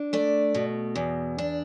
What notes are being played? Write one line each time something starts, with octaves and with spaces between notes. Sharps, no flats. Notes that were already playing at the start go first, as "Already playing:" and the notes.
Already playing: D4
A3 D5
B2
E2
D4